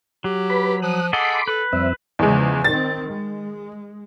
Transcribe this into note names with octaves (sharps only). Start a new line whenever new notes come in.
F#3 G4
B4 B5
F3 D#6 F#6
G#4 A4 D#5 F#5 B5 C6 D6
A4 B4
F2 G3 C4 E5
E2 C#3 F3 G#3
D#3 C4 A6
G#3